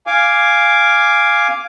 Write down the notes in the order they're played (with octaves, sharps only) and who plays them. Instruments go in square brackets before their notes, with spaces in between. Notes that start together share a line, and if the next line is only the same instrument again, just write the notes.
[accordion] F5 G#5 D6